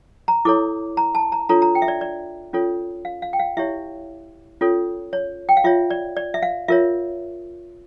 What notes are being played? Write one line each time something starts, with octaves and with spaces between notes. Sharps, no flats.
A#5
E4 A4 C#5 D6
A#5
A5
A#5
D4 F4 A4 C#5 A#5
A#5
G5
E5
D5
D5
C#4 F4 A4 C#5
F5
F5
G5
F5
E4 G4 C#5 E5
C#4 F4 A4 C#5
C#5
G5
F5
F4 C#5 E5
D5
D5
E5
F5
F4 A#4 C#5 E5